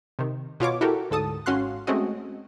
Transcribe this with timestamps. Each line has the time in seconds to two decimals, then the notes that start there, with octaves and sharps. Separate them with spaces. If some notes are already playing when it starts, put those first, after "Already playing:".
0.19 C3 D#3
0.60 B2 F4 C#5 D6
0.81 E4 F#4 G4 A4 A#4
1.11 D2 G#2 A4 A5 D#6
1.46 G#1 C#4 F#4 F5 C6 F#6
1.87 G#3 A3 C4 C#4 F#4 D#5